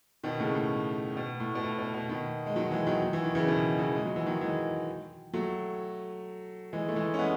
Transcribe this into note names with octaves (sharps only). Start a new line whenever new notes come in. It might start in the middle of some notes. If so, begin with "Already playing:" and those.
B2 D#3
A2 C#3
A2
B2
A2
B2
A2
B2
B2
B2 D#3
G#3
D#3 F#3
E3 G#3
D#3 F#3
F#3
E3
D#3
C#3 E3
B2 D#3
C#3 E3
G#3
F#3
E3
D#3 F#3
E3 G#3
F#3 A3
E3 G#3
A3
E3 G#3
C#4
G#3 B3